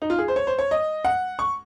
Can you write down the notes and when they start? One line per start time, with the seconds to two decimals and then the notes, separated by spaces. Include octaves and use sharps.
0.02 D#4
0.10 F4
0.19 G#4
0.28 C5
0.36 C#5
0.47 C5
0.59 C#5
0.71 D#5
1.05 F#5
1.39 C#6